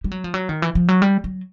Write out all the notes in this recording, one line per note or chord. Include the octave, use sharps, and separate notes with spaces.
G3
F#3
F3
F#3
D#3
E3
F3
F#3
G3
F#3